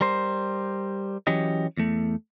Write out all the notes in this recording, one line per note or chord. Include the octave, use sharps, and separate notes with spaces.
G3 A#4 C5
E3 F#3 C#4 G4 D#5
E2 A3